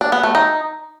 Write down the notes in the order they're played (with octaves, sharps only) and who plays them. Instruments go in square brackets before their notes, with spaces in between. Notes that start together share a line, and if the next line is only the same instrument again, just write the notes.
[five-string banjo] D4
B3
A3
D#4